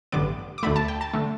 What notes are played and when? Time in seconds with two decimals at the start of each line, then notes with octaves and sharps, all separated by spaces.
0.12 A1 G2 D3 B3 D6
0.58 D6
0.63 D2 D3 A3 B5
0.76 A5
0.88 G5
1.01 A5
1.14 D3 A3